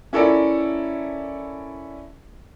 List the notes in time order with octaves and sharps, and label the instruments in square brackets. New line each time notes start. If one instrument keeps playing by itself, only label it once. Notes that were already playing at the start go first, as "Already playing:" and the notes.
[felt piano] C#4 E4 A4 A#4 D5